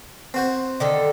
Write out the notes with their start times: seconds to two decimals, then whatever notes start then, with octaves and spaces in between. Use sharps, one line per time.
0.34 C4 F#4 C5
0.80 D3 D#3 A4